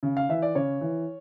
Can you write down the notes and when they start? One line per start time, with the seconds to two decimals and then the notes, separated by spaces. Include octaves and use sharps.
0.03 C#3
0.17 F5
0.29 E3 E5
0.42 D5
0.55 C#3 C#5
0.81 E3